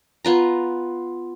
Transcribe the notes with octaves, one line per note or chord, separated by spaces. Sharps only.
B3 F4 A#5